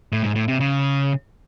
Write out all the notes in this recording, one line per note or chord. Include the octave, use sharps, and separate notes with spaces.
A2
G#2
A2
C3
C#3